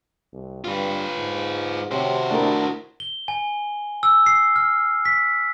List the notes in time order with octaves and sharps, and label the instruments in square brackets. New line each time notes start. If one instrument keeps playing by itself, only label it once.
[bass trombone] C2
[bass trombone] G2 [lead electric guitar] F4 B4
[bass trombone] G#2
[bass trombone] C3 [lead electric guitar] F#4 C5 [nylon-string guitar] G4 C#5
[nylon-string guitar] A3 A#4 [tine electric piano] D4 E4
[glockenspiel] G7
G#5
E6
C7
F6
B6